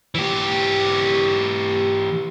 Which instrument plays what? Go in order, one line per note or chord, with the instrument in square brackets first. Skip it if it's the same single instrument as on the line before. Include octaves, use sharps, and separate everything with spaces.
[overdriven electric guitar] E3 G4